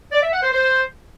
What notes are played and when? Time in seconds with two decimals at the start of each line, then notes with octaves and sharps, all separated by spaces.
0.12 D5
0.22 E5
0.32 F#5
0.42 C5
0.53 C5